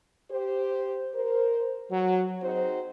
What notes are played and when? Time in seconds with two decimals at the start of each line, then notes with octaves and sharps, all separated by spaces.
0.31 G4 C5
1.14 A#4 C5
1.90 F#3
2.42 C4 D#4 F#4 G#4 C5